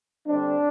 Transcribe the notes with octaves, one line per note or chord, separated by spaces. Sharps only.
D3 G3 C4 D4